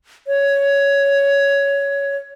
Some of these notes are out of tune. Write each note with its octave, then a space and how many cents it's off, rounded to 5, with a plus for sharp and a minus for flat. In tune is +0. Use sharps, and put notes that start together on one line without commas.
C#5 +10